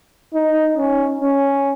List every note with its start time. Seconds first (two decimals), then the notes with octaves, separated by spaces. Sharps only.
0.34 D#4
0.77 C#4
1.21 C#4